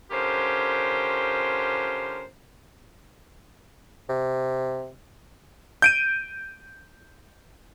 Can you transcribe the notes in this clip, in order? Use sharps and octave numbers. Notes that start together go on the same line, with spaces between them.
D3 C#4 F4 G4 A#4 C5
C3
G6 D7 D#7